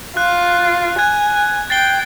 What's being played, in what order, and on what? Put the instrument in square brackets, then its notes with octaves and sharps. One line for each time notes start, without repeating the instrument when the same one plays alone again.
[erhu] F4 [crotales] F#6
[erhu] G#5 [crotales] F#6 G#6
[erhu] G5 [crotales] A6 C7 G7